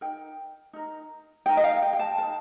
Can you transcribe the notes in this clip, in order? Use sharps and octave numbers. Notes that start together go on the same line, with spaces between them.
D#4 A#4 G5
D#4 A#4
D#4 A#4 G5
D#5
F5
G5
G5
A5
D#4 A#4 A5